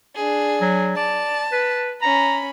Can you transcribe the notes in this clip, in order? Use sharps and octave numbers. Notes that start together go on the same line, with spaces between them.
D4 G#4
F#3
D5 A5
B4
C#4 A#5 B5